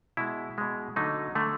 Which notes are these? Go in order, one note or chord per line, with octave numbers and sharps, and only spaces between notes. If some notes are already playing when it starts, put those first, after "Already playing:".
B2 G#3 E4
B2 G#3
D3 F#3 A3 D#4
D3 F#3 A3